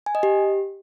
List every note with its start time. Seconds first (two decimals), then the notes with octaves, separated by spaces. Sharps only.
0.06 G#5
0.15 D#5
0.23 G4